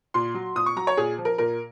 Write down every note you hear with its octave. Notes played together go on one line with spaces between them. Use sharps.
A#2 C6
F#3
A#2 D#6
C#6
F#3 A#5
C#5
A#2 G#4
F3
A#4
A#2 A#4